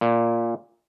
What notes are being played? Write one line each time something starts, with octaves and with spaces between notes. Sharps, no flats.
A#2